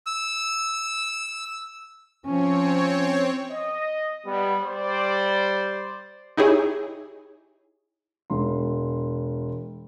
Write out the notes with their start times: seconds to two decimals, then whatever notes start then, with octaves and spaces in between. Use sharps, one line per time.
0.06 E6
2.26 F3 C4 C#4 C#5
3.51 D#5
4.27 G3 B3
4.63 G3 C5 D5
6.37 D#4 E4 G4 G#4 C#5
8.30 E1 C6